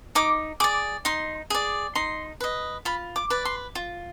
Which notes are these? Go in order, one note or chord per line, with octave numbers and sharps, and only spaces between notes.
D#4 D6
G#4 D5 D6
D#4 C6
G#4 D5
D#4 C6
B4 D#5
F4 B5
D6
B4 D5
C6
F4